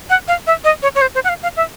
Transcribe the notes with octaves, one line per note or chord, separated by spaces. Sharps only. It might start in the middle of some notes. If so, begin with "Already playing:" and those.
F#5
F5
E5
D#5
C#5
C#5
C5
C5
F#5
F5
F5
E5